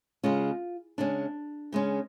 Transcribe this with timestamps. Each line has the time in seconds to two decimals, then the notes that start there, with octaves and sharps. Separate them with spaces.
0.23 C#3 G#3 C#4 F4
0.98 C#3 G#3 C#4 D4
1.72 C#3 G#3 C#4